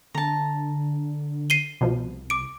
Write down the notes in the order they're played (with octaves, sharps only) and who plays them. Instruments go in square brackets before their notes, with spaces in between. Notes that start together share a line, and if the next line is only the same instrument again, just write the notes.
[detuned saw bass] D3 [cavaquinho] A5 A#5
[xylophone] C7 D#7 G7
[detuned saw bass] C2 [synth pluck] B2 F3
[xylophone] D6 D7